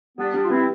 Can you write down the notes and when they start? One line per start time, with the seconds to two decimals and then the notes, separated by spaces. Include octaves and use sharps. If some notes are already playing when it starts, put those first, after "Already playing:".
0.18 G3 B3 D4
0.34 G3 B3 D4
0.44 F4
0.50 B3 C4 E4